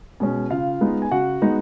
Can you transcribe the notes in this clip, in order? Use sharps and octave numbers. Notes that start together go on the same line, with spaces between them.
B2 G#3 C#4
C#3 F4 F5
G#3 B3 D#4
G#5
C#3 F#4 F#5
G#3 B3 D#4